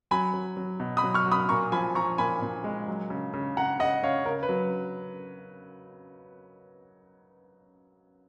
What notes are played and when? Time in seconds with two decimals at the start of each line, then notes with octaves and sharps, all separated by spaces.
0.11 F#3 G#5 B5
0.34 F#3
0.57 F#3
0.80 B2
0.97 B5 D#6
1.04 F#3
1.14 C#6 F6
1.26 F#3
1.32 B5 D#6
1.49 A#2 A#5 C#6
1.72 F3 G#5 B5
1.95 F3 A#5 C#6
2.18 A#2 G#5 B5
2.42 A#2
2.64 G#3
2.88 F#3
3.10 C#3
3.34 C#3
3.57 C#3 F#5 A#5
3.80 C#3 D#5 F#5
4.03 C#3 C#5 F5
4.26 C#3 A#4
4.43 B4
4.49 F#3